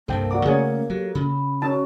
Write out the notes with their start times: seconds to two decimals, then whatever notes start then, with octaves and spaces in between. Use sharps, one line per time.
0.08 C2 G2 C3 A#3 A4 C5 G5 A5
0.31 F#4 D5 F#5 A#5 D6
0.45 C#3 A3 C#4 G#4 C#5
0.90 F#3 F#4 G4 A4
1.15 C#3 B5
1.62 C#4 D#4 F#4 A5